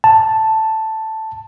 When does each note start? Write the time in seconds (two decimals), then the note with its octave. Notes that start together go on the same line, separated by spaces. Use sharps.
0.04 A5